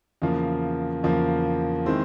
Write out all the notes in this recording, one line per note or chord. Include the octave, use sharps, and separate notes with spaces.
E2 C#3 F3 A#3
E2 C#3 F3 A#3
D#3 G#3 C4 E4